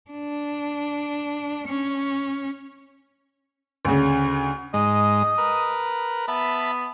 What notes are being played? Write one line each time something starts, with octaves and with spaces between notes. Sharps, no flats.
D4
C#4
D2 C#3
G#2 G#3 D#5
A#4 B4
B3 E5 A5 B5